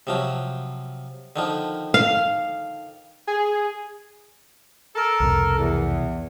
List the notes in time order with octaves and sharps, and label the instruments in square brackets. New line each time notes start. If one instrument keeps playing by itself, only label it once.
[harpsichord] C3 F3 F#3
D3 D#3 F3
[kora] F5
[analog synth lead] G#4
[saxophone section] A4 A#4
[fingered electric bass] C2 F2 B2
[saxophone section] E2